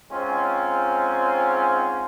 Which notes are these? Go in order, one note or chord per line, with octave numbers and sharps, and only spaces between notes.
G#2 C4 C#4 F4